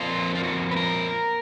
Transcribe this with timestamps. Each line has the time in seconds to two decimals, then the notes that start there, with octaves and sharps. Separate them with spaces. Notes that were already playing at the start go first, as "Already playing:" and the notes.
Already playing: F2 F3 A#3 F4
0.35 F4
0.43 F#4
0.71 B4
0.76 A#4